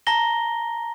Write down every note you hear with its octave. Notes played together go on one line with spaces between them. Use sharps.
A5 A#5 A#6 G7